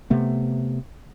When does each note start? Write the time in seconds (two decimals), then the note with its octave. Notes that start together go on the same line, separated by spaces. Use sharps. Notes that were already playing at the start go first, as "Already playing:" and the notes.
0.10 C3 A3 B3